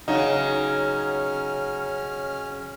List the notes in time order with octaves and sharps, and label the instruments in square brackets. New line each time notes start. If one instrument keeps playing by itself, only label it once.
[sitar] C#3 F#3 [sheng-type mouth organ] C#4 F6 [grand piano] D#4